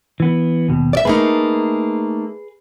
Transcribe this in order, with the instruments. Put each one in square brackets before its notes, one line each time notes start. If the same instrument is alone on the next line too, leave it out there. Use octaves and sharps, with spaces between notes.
[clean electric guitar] E3 B3
D#2 B2
[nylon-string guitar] D5 E5
[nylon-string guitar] A3 A#3 D#4 [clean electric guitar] G#4 B4